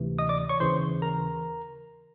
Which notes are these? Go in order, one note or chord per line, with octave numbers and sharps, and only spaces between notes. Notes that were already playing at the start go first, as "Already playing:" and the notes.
Already playing: D2 C3 E3
D#5 D#6
D5 D6
C#5 C#6
D#2 C#3 E3 C5 C6
A#4 A#5